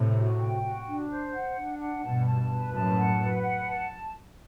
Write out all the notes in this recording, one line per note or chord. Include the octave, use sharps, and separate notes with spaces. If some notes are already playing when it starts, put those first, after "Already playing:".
Already playing: A2 C3
F#4
G5
F#4
D4
C5
F#5
D4
F#5
G2 B2 A5
A5
B4
F#2 A2 A5
F#5
B4
F#5
A5